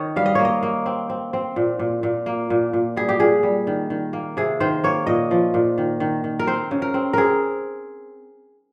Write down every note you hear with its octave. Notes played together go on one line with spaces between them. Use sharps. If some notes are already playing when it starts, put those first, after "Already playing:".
Already playing: D#3 C#5 D#5
G3 F5
D#5
A#3 C#5
D#5
A#3
C4
C4
C4
A#2
A#2
A#2
A#3
A#2
A#2
G3 G#4
G4
A#2 G#4
G3
D#3
D#3
A#3
C3 G#4
D#3 C5
A#3 C#5
A#2 D#5
F3
A#2
D#3
D#3
D#3
A#4
C4 C5
C#3
A#4
C4
C4 G#4 A#4